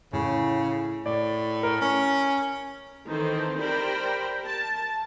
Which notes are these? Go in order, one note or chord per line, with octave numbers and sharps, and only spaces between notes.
A2 C#3
A2 D5
A#4
C#4
D#3 E3 C4 D#4 A4 C5
G4 A#4 C5 D5 G5 B5
A#4 A5